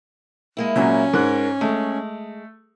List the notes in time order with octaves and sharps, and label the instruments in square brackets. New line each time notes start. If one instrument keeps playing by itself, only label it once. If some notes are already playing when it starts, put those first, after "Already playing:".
[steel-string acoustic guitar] G#3 A#3 E4
[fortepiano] A#2 F#3 [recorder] C#4
[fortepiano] G#2 F#6 [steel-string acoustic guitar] A#4
[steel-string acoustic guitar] G#3 [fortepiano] A3